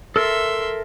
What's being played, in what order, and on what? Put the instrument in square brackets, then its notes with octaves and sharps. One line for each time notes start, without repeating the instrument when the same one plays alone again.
[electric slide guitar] A4 A#4 [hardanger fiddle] E5 C6